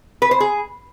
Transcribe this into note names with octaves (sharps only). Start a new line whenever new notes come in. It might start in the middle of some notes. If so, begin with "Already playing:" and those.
B4
C5
G#4